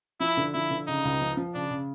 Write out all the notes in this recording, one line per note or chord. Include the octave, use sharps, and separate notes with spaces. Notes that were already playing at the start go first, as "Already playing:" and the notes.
F3 E4
D3
F3 E4
D3
C#3 D#4
C#2
F3
F3
C#3 D4
C#3